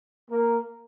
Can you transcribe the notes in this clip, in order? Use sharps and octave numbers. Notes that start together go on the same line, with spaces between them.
A#3 A#4